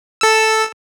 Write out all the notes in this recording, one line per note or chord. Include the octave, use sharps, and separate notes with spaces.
A4 E6